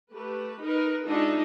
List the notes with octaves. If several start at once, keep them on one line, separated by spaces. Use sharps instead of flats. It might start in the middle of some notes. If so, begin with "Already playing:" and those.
A3 G4 B4
D#4 A#4 B4
G#3 D4 D#4 F4 F#4 E5